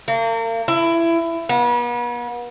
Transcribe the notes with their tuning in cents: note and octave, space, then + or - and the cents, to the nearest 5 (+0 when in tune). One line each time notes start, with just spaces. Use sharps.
A#3 -40
E4 +20
B3 -40